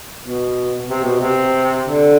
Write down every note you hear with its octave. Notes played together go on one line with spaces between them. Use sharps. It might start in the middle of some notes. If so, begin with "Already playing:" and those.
B2
C3
B2
C3
D3